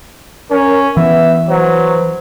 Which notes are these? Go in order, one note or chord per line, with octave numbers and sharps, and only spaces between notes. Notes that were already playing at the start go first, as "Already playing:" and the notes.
C#4 A#4
E3 B3 E5
F#3 B4 C5